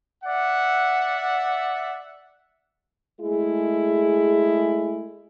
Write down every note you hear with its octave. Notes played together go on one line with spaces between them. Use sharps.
D5 E5 F#5
G#3 A3 E4 G#4